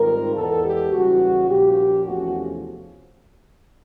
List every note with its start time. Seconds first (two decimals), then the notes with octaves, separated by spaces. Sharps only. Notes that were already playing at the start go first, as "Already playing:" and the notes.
Already playing: G#2 D#3 G3 C4 F4 A#4
0.35 E2 B2 G#3 B3 A4
0.64 G4
0.91 F#1 E2 C#3 E3 G3 F#4
1.49 A#1 A#2 F3 A#3 C#4 G4
2.06 E2 C3 F3 A3 C#4 F#4